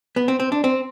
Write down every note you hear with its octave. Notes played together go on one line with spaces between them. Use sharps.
B3
C4
C4
D4
C4